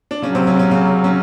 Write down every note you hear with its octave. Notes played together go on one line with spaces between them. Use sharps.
D4
C#3 F#3 C#4
C3 C4
C#3 C#4
C#3 C#4
C#3 C#4
C#3 C#4